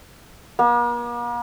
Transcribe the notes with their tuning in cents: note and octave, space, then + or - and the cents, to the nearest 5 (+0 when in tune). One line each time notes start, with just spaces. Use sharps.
A#3 +45